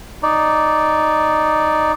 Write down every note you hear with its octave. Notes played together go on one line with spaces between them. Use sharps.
D#4 D5